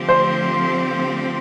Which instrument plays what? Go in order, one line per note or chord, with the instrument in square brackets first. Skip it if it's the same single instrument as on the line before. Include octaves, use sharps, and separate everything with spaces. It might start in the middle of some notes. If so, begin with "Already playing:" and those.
Already playing: [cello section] D3 F3 A3 C4 G4
[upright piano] C5